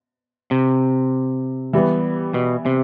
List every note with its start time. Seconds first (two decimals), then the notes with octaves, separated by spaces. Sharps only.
0.51 C3
1.73 E3 G3 B3
2.34 B2
2.66 C3